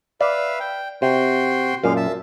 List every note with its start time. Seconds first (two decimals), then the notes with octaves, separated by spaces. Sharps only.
0.21 B4 D5 E5 F5
0.60 G5
1.02 C3 F#4 G5 C6
1.84 F#2 A#2 G#3 F5
1.96 E5 A5